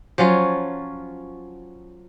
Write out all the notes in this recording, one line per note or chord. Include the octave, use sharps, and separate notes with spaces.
F3 F#3 C#4 F4